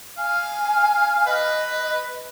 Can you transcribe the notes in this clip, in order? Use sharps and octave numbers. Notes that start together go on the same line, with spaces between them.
F5 G#5
B4 D#5